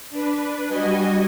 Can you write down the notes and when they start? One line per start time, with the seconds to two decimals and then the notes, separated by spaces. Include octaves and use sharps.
0.10 D4 B4
0.68 G3 F#4 D#5 G#5